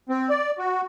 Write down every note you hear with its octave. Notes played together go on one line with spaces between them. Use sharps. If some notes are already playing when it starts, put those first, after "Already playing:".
C4
D5
F#4